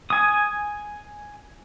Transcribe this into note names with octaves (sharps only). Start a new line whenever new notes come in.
G#5 D#6